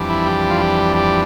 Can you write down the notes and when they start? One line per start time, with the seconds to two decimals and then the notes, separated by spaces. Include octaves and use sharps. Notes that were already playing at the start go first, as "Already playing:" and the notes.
Already playing: F2 E3 G3 D4
0.10 E4
0.26 G4
0.50 F4
0.61 G4
0.96 G4